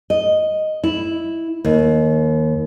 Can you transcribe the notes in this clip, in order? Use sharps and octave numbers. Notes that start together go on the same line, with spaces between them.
D#5
E4
D#2